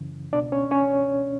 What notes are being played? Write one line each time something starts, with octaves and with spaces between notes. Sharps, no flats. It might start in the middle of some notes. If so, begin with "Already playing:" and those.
Already playing: F#2 C#3 E3
C#2 B2 D4 D5
C#4 C#5
C#4 C#5